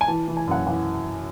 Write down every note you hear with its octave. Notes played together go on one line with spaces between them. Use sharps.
G#5
E3 A5
E3
G#5
F#2 F#5
E3 F#5